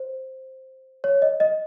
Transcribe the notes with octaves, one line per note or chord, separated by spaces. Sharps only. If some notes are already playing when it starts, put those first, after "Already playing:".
Already playing: C5
C#5
D#5
D#5